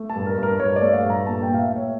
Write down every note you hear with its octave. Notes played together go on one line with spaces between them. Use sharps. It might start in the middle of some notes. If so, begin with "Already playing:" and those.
Already playing: A3
A5
G2
A#4
G2
A#4
G2 C#5
D5
A3
F5
G2
A#5
A#2 A5
G5
A#2
F5
E5
A3
C#5